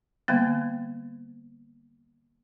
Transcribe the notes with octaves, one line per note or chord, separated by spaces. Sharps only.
D3 G3 A#3 B3